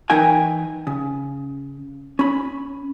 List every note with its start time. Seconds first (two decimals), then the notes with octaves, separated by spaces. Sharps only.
0.10 E3 D#4 A#4 B4 G5 G#5
0.87 C#3
2.19 C#4 B5